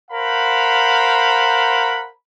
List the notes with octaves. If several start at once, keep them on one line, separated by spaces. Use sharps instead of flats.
A#4 C5 F5 F#5 B5